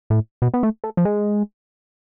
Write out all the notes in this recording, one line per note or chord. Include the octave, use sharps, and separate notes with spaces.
A2
B2
B3
A3
A3
F3
G#3